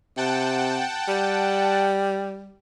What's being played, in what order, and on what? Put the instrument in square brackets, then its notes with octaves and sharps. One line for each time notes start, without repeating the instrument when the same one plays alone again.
[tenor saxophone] C3 [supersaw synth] F#5 G5 A5
[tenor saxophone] G3